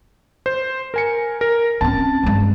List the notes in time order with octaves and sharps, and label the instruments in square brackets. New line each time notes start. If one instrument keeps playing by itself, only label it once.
[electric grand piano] C5
A#4 G#5 C#7
A#4
[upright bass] C4 C#4 [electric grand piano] A5
[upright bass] G2 G#3